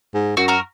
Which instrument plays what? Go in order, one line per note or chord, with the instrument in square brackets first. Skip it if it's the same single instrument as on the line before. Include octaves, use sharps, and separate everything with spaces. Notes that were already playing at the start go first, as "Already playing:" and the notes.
[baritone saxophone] G#2
[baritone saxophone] F#2 [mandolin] F#4
[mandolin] F#4 A#4